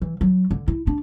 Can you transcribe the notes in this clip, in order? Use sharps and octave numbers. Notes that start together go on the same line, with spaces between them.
E3
F#3
D3
E4
D4